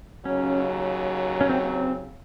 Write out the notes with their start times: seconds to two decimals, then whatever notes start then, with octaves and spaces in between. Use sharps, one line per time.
0.25 D#2 C#3 F#3 C#4
1.41 C#4
1.49 C4
1.65 C4